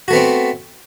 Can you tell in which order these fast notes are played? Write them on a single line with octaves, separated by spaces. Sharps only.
F#4 A3 B3 C4